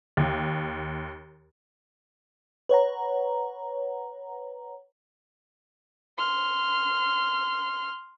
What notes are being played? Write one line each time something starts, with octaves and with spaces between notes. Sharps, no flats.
D#2
B4 C#5 F#5 A#5
C6 F6